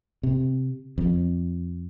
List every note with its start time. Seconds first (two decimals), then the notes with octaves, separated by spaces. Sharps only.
0.23 C3
0.98 F2